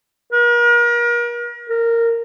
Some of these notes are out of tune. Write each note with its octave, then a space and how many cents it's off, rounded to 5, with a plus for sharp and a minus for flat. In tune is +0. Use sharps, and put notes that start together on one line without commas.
A#4 +40
A#4 -15